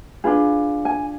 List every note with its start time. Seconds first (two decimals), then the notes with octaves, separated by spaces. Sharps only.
0.24 D4 F4 G#4 B4
0.85 G#5